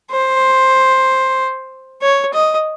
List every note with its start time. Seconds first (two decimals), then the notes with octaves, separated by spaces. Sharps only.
0.11 C5
2.02 C#5
2.33 D#5